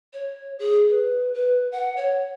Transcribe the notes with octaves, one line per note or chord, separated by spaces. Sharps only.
C#5
G#4
B4
B4
F#5
C#5